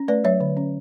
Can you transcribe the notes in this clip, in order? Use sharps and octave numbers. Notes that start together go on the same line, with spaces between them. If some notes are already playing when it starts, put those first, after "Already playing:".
Already playing: C#4
A3 B4 D5
F#3 C#5 E5
D3
C#4